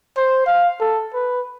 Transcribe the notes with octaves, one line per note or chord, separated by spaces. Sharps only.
C5
F5
A4
B4